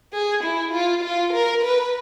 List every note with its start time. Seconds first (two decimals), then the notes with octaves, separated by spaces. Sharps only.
0.13 G#4
0.43 E4
0.73 F4
1.03 F4
1.33 A#4
1.62 B4